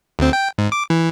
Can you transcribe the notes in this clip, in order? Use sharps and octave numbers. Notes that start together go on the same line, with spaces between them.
D2 C4
G5
G#2
D6
E3